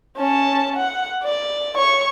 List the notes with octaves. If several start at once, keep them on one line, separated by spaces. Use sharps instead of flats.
C#4 A5
F#5
D5
C#5 C#6